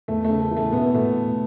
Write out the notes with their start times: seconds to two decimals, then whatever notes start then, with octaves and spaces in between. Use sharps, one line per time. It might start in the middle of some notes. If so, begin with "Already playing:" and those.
0.08 E2 A3
0.24 A3
0.30 C#3
0.40 A3
0.51 E3
0.56 A3
0.72 B2 B3
0.94 B2 A3